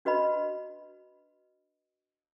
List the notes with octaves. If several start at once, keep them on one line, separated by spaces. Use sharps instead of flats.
D4 F#4 B4 D#5 B5